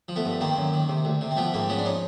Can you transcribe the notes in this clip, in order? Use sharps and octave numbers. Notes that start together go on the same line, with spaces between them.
F3
A3 B3
G2
D#3 A#3 C4
F#2
D#3
C3
D2
C3
C4
F3 A3 B3
G#2 A#3 C4
F3 B3 C#4
D4
C#4 D#4